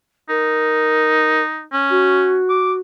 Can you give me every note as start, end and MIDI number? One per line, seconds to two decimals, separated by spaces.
0.29 1.65 63
0.29 1.42 70
1.73 2.41 61
1.90 2.79 66
2.50 2.73 86